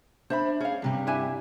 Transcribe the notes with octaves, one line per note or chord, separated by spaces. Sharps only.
D4 C5 E5 B5
C#4 G#4 F5
G2 C3 G3
D4 E4 G#5